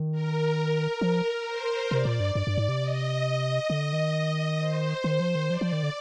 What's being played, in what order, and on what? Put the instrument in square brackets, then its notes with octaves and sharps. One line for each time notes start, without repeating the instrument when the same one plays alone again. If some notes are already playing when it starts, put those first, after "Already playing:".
Already playing: [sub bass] D#3
[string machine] A#4
[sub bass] F3
[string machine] C5
[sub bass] C3 [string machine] D5
[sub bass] A#2
G2
G2
G2
G#2
C3
[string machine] D#5
[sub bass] D3
D#3
[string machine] D#5
C5
[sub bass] D#3 [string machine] C5
[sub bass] F3
D#3
[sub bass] F3 [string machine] D5
[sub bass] F3
D#3
D3